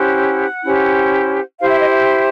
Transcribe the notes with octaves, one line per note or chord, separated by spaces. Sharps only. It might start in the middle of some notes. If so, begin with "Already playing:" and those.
Already playing: C#4 E4 G4 C5 F#5
C#4 E4 G4 C5
E4 G4 C5 F5
E5
D#5
E5